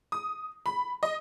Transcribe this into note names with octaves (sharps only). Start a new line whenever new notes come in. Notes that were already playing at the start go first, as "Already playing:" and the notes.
D#6
B5
D#5